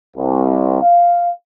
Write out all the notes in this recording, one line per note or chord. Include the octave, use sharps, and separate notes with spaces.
C2
F5